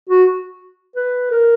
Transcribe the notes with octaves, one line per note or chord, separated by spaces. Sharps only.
F#4
B4
A#4